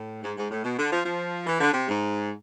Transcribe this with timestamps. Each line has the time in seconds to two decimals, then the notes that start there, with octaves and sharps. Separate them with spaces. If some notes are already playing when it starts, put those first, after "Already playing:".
Already playing: A2
0.23 G#2
0.37 G#2
0.51 A2
0.64 B2
0.78 D3
0.92 F3
1.05 F3
1.47 E3
1.61 D3
1.73 C3
1.88 G#2